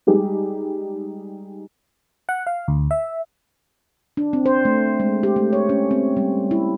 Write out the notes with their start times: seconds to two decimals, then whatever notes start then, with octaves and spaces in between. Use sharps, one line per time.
0.07 G3 G#3 D#4 G4 G#4
2.29 F#5
2.47 F5
2.68 D2
2.91 E5
4.17 D4
4.33 C4
4.46 C5
4.65 A3
5.00 G#3
5.23 G4
5.36 A3
5.53 C#5
5.69 C#4
5.91 C4
6.17 G3
6.51 E4